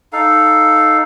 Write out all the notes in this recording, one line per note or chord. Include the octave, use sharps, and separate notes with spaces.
D#4 A4 F5